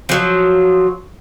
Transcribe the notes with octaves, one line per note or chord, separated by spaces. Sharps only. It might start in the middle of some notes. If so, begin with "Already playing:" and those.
F3 F#3